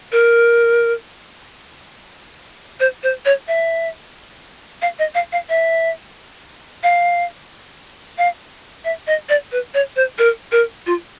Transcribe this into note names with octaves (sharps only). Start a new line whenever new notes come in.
A#4
C5
C5
C#5
E5
F5
D#5
F5
F5
E5
F5
F5
E5
D#5
D5
B4
C#5
C5
A#4
A#4
F4